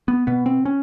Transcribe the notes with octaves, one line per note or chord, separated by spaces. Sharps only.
B3
B2 B3
C4
C#4